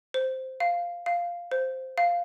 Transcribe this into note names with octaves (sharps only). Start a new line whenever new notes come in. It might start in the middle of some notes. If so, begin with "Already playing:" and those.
C5
F5
F5
C5
F5